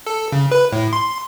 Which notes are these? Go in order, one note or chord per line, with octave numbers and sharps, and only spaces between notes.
A4
C#3
B4
A2
C6